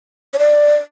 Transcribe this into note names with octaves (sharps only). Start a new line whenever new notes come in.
C#5
D5